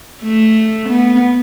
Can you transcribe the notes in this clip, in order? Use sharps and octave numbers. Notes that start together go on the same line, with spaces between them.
A3
B3